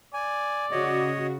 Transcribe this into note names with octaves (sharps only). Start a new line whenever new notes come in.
D5 G#5
C#3 F#4 C#5 D#5